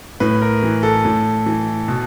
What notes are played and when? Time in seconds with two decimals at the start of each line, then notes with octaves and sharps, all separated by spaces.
0.20 A2 B4
0.41 A#4
0.63 E3
0.83 A4
1.05 A2
1.46 E3
1.88 B2